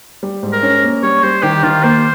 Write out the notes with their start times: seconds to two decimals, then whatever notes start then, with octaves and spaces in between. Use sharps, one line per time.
0.23 G3
0.43 G#2
0.53 A#4
0.63 C#4
0.83 A#3
1.03 G3 C#5
1.23 G3 C5
1.43 D#3 G4
1.63 D#3 F4
1.83 A#3 C5